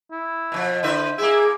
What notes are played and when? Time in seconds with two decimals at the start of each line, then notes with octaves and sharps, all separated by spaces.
0.12 E4
0.52 B2 D#3 F3
0.83 D3 E4 B4 C5 E5
1.18 A#3 E4 G#4 E5